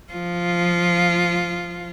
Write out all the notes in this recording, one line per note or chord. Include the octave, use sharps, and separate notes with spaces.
F3 F4